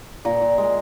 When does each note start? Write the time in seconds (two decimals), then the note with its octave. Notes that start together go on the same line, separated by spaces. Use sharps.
0.25 A#2 A#4
0.42 A#2
0.58 G#3